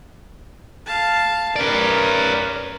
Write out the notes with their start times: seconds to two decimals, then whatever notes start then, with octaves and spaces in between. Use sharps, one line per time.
0.86 F5 A5
1.56 C#4 A#4 B4 D5